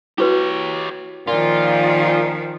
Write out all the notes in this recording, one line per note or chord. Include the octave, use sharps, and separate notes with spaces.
E4 F#4 G4 B4 C#5
A#2 D#3 F3 F4